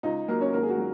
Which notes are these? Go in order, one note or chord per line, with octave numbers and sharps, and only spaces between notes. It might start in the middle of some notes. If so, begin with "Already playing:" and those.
C#2 D#4
F#3 A#3 A#4
C#4 C#5
G#1 A#3 A#4
G#4
F#4
F#3